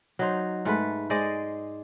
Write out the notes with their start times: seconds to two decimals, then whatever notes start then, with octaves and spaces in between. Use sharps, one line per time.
0.19 F#3 D#4 C5
0.65 G#2 A3 B4
1.10 G#3 C5 D5 D#5